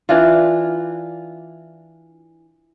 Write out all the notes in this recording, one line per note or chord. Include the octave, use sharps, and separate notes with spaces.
E3 D4 F4